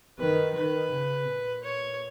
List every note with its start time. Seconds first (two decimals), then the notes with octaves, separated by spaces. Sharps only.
0.19 D#3 B4
0.55 D#3 B4
0.91 C#3
1.27 A#2
1.63 C#5